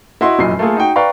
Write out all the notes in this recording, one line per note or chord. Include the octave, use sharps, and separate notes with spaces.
E4 F#4 D#5 C6
F1 F#2 A#2 D#5 C7
A3 A#3 F4 G#4 A4
D#4 F#4 G5
B4 D5 F5 G5 A#5 C#6